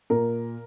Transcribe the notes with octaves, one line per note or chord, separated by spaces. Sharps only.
A#2 A#4